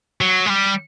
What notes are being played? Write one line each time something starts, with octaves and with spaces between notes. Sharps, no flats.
F#3
G#3
G3